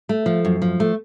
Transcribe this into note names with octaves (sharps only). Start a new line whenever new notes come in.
A3
F3
F#2
F3
A3